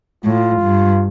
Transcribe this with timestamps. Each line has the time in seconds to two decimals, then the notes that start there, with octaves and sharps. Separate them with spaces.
0.24 A2 F4
0.62 G2